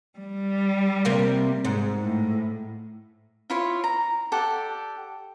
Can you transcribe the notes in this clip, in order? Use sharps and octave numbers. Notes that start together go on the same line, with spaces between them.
G3
C3 A#3 C4
G#2
A2
E4 F4 C#5
A#5
G4 A4 D5 F#5